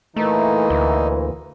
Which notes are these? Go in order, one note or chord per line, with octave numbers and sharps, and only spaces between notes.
A#2 E3 A3 D#4
D2